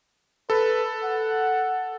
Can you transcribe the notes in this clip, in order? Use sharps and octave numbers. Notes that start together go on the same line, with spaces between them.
A4 B4
F#5